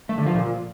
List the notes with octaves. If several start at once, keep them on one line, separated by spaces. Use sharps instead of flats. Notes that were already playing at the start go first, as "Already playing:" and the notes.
A3
D3
F3
A#2